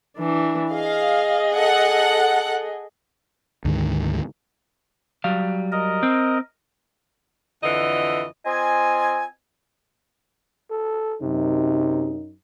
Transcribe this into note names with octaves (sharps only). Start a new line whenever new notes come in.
E3 D4
G#4 D#5 F5
A4 F#5
D2 G#2 D#3
F#3 G3 F5
A#4 D#5
C4
F2 D3 E3 D#5
C4 F4 D#5 G#5
A4
F#2 C3 D#4